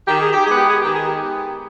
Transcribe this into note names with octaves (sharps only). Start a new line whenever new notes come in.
D#3 G4
G#4
G4
G#3 B3 G#4
G4
G#4
D#3 G4
G#4
G4
G#3 B3